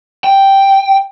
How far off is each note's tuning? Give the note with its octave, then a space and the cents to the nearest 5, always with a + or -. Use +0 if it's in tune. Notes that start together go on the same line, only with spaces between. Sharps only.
G5 -5